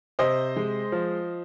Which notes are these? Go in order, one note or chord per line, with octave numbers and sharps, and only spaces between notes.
C3 C5 D#5
G#3
F3